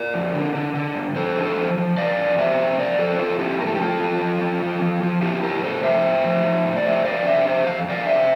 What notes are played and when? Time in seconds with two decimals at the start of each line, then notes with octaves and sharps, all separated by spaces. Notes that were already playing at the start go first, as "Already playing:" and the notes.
Already playing: A#4 D5
0.14 F2
0.34 D3
0.55 D3
0.75 D3
0.95 G2
1.15 F3 A4 C5
1.37 D3
1.42 A4 C5
1.57 F3
1.78 F3
1.98 F2 D5 F5
2.18 F2
2.38 C3 C5 E5
2.58 F2
2.79 F3 A#4 D5
2.98 F3 A4 C5
3.19 F2 F4 A4
3.39 F2 E4 G4
3.60 A2 A#4
3.67 A4
3.75 G4
3.80 F3 F4 A4
4.00 F3
4.21 F3
4.42 F3
4.62 F3
4.82 F3
5.03 F3
5.22 F3 E4 G4
5.43 A2 G4 A#4
5.63 A2 A4 C5
5.83 F3 C5 E5
6.03 A2
6.24 F3
6.45 F3
6.65 A2
6.76 D5
6.85 F2 C5 E5
7.05 F2 D5 F5
7.26 D3 C5 E5
7.46 F2 C5 E5
7.66 F2 F5
7.87 F2 D5 F5
8.07 D3 C5 E5